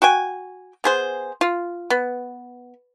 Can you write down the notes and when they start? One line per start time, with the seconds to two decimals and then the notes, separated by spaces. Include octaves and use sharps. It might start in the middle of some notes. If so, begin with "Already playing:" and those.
0.02 F#4 G5 G#5
0.84 B3 G#4 C5
1.41 F4
1.90 B3